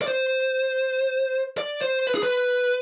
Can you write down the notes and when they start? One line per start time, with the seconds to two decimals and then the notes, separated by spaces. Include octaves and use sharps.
0.02 D5
0.08 C5
1.58 D5
1.82 C5
2.07 B4
2.15 G#4
2.23 B4